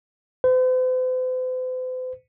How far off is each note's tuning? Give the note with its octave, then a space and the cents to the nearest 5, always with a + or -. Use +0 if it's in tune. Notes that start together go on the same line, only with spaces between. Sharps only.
C5 -45